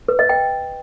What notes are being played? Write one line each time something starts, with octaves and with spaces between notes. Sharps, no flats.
B4
D#5
G5